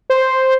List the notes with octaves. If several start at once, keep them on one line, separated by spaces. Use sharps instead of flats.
C5